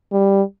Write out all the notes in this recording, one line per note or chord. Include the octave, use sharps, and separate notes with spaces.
G3